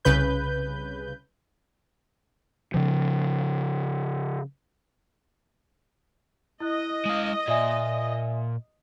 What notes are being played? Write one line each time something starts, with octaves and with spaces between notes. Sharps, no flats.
C2 C#3 B4 G6
C#3 F3
E4 D#5 F#6
G#3 F5
A#2 F4 D5 E5 G#5